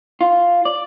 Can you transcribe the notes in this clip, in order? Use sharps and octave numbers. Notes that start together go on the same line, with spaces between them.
F4
D5